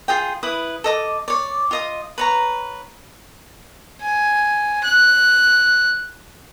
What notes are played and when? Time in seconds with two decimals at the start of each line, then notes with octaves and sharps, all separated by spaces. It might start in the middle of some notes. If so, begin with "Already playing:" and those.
0.08 F4 G#4 G5
0.43 E4 B4 D#6
0.84 A4 D#5 D6
1.28 C#5 D5
1.71 F4 D#5 D#6
2.18 B4 C#5 A#5
4.01 G#5
4.84 F#6